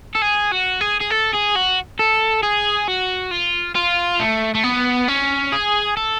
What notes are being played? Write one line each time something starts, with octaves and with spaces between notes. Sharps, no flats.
A4
G#4
F#4
G#4
G#4
A4
G#4
F#4
A4
G#4
F#4
F4
F4
A3
A3
B3
C#4
G#4
A4